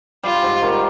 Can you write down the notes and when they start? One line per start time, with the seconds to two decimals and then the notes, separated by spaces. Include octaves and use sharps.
0.23 G3 F4
0.43 G#2
0.62 D#3